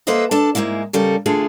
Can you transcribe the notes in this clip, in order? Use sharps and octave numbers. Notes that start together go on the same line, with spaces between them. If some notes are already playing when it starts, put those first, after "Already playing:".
A#3 A4 B4 C5 D#5 E5
D4 A4 A5
G#2 B2 G#3 A#3 E4
C#3 G3 A4 A#4
D3 E3 A3 F4 G#4 A4